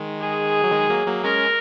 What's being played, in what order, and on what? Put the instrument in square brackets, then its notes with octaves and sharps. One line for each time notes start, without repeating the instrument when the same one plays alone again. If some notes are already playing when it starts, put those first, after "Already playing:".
Already playing: [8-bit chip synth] D#3 G#3
[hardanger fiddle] G#4
[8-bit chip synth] F#3
D#3 G#3
F#3 A#3
F#3 A#3
[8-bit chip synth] G#3 C#4 [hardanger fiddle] A#4